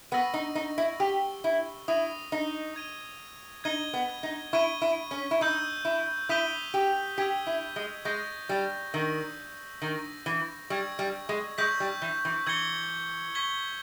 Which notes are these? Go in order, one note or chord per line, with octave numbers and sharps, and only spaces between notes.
B3 C#6 E6 A#6 D#7
D#4
D#4
E4
G4 E6 A#6 D#7 G7
E4
E4 D#6 A#6 D#7 G7
D#4
G#6 D#7 G7
D#4 G#6 D#7 G7
B3
D#4
E4 C#6 G#6 D#7 G7
E4
C#4
E4
D#4 C#6 E6 G6
E4
E4 D#6 G6 B6 D#7 G7
G4
G4 E6 G#6 B6
E4
G#3
G#3 C#6 E6 G6 A#6 D#7
G3
D#3 C#6 E6 G6 B6
D#3 G6 A#6 D#7
E3
G3 C#6 E6 G#6
G3
G#3
G#3 C#6 E6 G6 B6
G3
E3
E3
E3 E6 G#6 C#7 G7
C#6 G#6 B6 G7